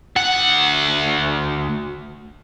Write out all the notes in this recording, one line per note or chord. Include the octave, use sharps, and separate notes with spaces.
D2 F#5